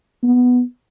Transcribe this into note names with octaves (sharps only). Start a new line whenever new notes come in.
B3